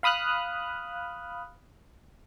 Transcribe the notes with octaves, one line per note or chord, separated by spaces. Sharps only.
F5 B5 D#6 F6 F#6